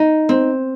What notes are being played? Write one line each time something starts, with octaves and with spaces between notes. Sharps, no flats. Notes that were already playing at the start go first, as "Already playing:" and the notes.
Already playing: D#4
C4